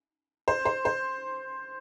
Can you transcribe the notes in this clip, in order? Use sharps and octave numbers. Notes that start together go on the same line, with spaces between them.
C5
C5
C5